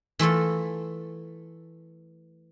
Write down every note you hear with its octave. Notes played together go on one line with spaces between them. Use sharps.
E3 A3 F4 A4